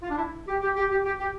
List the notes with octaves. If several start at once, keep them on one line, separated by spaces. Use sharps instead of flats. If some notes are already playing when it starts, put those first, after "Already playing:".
F4
D4
E4
G4
G4
G4
G4
G4
G4